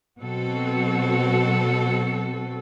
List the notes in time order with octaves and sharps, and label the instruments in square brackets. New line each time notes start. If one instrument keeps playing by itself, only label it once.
[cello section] B2 F#3 C4 F#4 A4